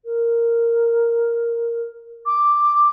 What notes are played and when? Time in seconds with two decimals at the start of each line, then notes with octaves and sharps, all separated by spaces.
0.05 A#4
2.26 D6